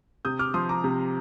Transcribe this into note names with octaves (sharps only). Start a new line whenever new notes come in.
C3 D#6 G6
D6 F6
F3 C6 D#6
A#5 D6
C3